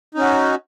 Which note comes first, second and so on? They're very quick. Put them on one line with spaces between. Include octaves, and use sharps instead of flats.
D#4 C#4 F#4